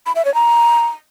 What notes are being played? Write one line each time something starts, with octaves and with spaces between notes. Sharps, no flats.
B5
E5
C#5
A#5